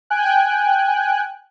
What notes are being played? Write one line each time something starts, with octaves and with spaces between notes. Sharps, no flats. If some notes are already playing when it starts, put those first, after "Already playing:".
G5 G#5 F#6